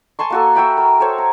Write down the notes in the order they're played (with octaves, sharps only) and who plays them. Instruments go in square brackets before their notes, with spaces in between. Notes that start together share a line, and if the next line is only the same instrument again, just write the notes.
[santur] G#5 A5 C6 C#6
A#3 F#4 A4
F#4 E5 G5 B5
A#4
A4 C5 C#5
A#5